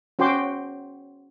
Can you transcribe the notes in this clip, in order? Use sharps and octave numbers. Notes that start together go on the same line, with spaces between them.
C#4 F#4 C5 G5 C6 D6